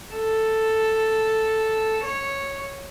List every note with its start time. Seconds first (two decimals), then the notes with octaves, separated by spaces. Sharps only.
0.15 A4
2.05 C#5